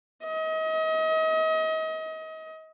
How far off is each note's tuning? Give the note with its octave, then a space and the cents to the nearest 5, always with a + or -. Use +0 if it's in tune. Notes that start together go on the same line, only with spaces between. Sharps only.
D#5 +35